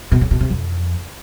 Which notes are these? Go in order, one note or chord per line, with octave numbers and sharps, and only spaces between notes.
B2
C#3
B2
C3
F2